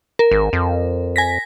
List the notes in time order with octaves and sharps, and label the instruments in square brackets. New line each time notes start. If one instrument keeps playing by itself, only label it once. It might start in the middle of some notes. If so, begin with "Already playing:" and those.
[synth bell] A#4
[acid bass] G#1
F2
[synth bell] G#5 A#6 B6